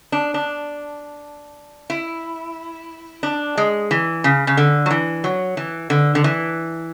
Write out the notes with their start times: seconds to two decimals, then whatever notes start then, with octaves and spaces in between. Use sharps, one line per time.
0.12 D4
0.34 D4
1.90 E4
3.23 D4
3.57 G#3
3.91 E3
4.24 C#3
4.47 C#3
4.57 D3
4.86 F#3
4.91 E3
5.24 F#3
5.57 E3
5.90 D3
6.15 D3
6.24 E3